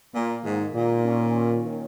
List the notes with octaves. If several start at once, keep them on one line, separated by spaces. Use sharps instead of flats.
A#2 A#3
G#2 D#3
A#2 A#3
C#4
C#4
D#3